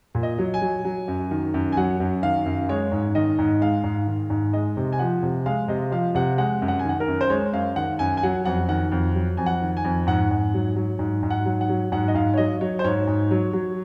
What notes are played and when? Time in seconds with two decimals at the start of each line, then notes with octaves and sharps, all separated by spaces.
0.15 A#2
0.23 D#5
0.39 F#3
0.54 G#5
0.62 F#3
0.85 F#3
1.08 F#2
1.31 D#3
1.54 F#2
1.72 G#5
1.77 F#3 F#5
2.00 F#2
2.23 D#3 F5
2.46 F#2
2.69 G#3 C#5
2.92 G#2
3.15 D#3 D#5
3.39 G#2
3.61 G#3 F5
3.84 G#2
4.07 D#3
4.30 G#2
4.53 G#3 D#5
4.77 C3
4.93 G#5
4.99 F3 F#5
5.23 C3
5.46 G#3 F5
5.68 C3 D#5
5.92 F3 F5
6.15 C3 F#5
6.38 G#3 F#5
6.62 F#2
6.68 F#5
6.79 G#5
6.85 D#3 F#5
7.00 A#4
7.08 F#2
7.21 C5
7.30 G#3 C#5
7.53 F#2 F5
7.76 D#3 F#5
7.99 F#2 G#5
8.17 G#5
8.23 F#3 F#5
8.45 F2 F#5
8.69 D#3 F#5
8.92 F2
9.15 F#3
9.37 F2 G#5
9.46 F#5
9.62 D#3
9.77 G#5
9.85 F2
10.07 G#2 F#5
10.31 G#2
10.54 F#3
10.76 F#3
10.99 G#2
11.23 G#2
11.30 F#5
11.45 F#3
11.61 F#5
11.69 F#3
11.92 G#2 F#5
12.08 D#5
12.14 G#2 F5
12.34 C#5
12.37 F#3 D#5
12.61 F#3 C#5
12.79 C5
12.84 G#2 C#5
13.07 G#2
13.31 F#3
13.53 F#3